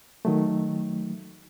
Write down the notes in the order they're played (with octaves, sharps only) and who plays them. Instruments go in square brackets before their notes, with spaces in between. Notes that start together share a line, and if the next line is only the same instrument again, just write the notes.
[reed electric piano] D#3 F#3 A3